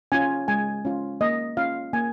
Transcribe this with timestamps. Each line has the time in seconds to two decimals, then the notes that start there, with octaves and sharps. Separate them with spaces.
0.12 C#4 F4 G#5
0.48 G#3 G#5
0.85 C#4 F4
1.21 A#3 D#5
1.57 C#4 F4 F5
1.93 A#3 G#5